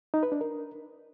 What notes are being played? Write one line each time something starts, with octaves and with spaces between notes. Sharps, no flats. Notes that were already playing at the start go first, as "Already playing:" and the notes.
D#4
B4
D4
A#4